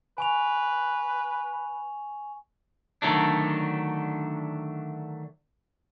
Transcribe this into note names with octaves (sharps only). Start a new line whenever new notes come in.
B4 G#5 C#6 F7
D3 D#3 F#3 A3 D4